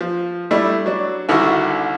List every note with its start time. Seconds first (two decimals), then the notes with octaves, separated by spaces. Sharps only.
0.01 F3
0.51 G3 A3 D4 E4
0.86 F#3 D4
1.29 C2 D3 D#3 E4 F#4